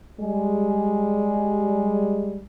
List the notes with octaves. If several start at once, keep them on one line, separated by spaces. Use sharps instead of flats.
G3 G#3